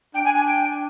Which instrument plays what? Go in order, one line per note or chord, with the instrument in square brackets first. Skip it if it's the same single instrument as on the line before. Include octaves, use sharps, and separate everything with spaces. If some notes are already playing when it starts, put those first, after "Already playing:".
[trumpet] D4 [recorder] G5
[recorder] G#5
G#5
G5